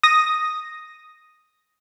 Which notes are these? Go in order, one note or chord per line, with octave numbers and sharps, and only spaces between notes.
D#6 A#6